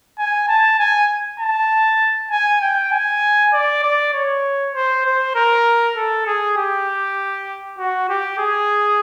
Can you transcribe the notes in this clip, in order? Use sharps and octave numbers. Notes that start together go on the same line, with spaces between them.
G#5
A5
G#5
A5
G#5
G5
G#5
D5
D5
C#5
C5
C5
A#4
A4
G#4
G4
F#4
G4
G#4